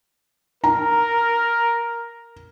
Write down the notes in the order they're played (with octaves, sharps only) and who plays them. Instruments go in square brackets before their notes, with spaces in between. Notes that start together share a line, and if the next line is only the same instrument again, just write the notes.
[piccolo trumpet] A#4 [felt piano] A#5